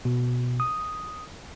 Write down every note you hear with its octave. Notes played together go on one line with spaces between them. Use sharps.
B2
D#6